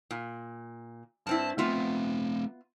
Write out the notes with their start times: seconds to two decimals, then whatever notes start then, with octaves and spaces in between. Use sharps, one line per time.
0.11 A#2
1.27 G2 C4 E4 A5
1.58 A3 B3 C4 F4 E5